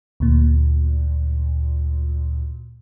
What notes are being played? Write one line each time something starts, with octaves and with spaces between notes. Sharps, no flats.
D2 A#2